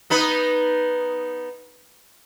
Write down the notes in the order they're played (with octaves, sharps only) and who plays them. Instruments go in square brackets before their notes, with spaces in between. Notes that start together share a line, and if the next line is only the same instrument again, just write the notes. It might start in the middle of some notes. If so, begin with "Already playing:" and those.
[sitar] B3 D#4 B4